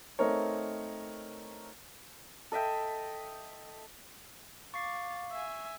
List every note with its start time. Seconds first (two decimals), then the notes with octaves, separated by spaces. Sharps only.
0.19 A3 C4 D#4 A#4 C#5
2.52 A4 D#5 E5 G5
4.74 F5 C#6 D6 A6 C7
5.31 E5 G#5